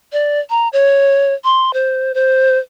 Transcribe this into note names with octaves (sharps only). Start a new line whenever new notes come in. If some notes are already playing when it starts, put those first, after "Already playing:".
D5
A#5
C#5
C6
C5
C5